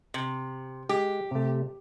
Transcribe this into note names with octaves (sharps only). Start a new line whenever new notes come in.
C3
G#3 G4
C3 A3